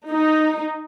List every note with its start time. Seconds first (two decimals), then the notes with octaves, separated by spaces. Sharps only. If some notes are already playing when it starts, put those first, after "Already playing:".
0.10 D#4